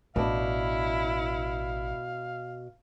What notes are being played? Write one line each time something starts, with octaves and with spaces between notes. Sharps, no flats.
A1 B2 D4 E4 F5